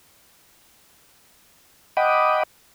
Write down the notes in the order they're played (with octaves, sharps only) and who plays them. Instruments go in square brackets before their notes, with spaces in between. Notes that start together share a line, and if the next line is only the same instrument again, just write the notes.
[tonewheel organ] D#5 F#5 G5 B5 D6 D#6